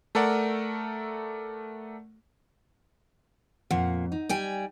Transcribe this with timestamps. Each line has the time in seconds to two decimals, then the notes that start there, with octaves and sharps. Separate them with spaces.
0.15 A3 A4 A#4 D5 F#5
3.71 F2 A#2 F5 F#5
4.12 D#4
4.29 G3 G5 G#5